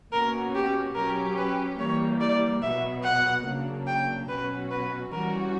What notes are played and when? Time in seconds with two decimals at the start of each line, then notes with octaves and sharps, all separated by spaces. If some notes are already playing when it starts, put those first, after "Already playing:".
0.12 B2 A#3 C#4 F#4 A#4
0.55 G4
0.95 F#3 C#4 G4 A#4
1.38 B4
1.79 E3 G3 A#3 C#5
2.21 D5
2.62 B2 F#3 B3 E5
3.04 F#5
3.45 C#3 F#3 A#3 D4
3.87 G5
4.29 B2 F#3 C#4 F#4 B4
4.71 B4
5.12 E3 G3 C#4 F#4 A#4